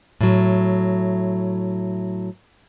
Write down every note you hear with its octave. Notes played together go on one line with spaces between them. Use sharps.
A2 F#3